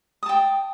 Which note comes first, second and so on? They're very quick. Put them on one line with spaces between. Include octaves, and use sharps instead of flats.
D#6 A5 G5